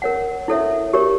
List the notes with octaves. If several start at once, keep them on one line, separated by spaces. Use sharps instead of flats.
A#4 C#5 F#5
E4 A4 C#5 E5
G4 A#4 C#5